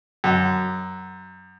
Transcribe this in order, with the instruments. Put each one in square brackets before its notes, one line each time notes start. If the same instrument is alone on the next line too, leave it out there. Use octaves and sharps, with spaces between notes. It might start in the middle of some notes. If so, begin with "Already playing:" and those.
[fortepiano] F#2